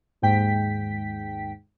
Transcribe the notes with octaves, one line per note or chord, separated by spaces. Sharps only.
D#2 G#2 G5 B6